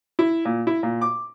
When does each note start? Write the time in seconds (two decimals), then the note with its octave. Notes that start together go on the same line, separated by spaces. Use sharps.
0.19 E4
0.45 A#2
0.67 E4
0.83 A#2
1.01 D6